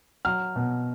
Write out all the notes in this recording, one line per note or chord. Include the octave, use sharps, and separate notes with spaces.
F#3 F6
B2